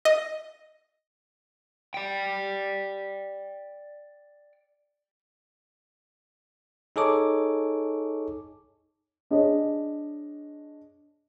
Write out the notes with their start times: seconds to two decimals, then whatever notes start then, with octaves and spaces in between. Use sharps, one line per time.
0.05 D#5
1.94 D5 G5
6.96 D#4 G#4 A4 C#5 D6
9.31 D4 G#4 C#5 D#5